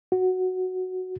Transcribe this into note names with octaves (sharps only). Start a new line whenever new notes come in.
F#4